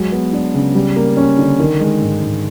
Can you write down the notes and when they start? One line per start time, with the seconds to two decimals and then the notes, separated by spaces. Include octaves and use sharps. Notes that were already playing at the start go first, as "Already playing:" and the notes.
Already playing: F#3 G#3
0.12 B3
0.33 D4
0.54 C#3
0.75 G3
0.96 A#3
1.17 C#4
1.38 D3
1.60 D#3
1.80 G#3
2.01 G#2
2.23 G#2